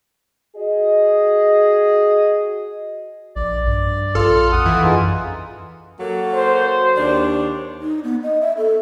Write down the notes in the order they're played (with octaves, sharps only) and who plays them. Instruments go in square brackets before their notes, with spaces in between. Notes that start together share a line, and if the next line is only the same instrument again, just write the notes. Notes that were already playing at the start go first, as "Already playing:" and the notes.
[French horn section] F#4 G#4 D#5
[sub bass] A#1 [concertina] D5
[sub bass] G2
[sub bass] A#1 [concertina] F4 F6 [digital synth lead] A4
[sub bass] F2 [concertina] F#5 D#6
[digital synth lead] E3
[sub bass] F#2 [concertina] D#4 F4 G#4
[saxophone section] F#3 A#3 A4
[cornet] C5
[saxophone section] D#2 D4
[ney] D#4
B3
D#5
E5
A4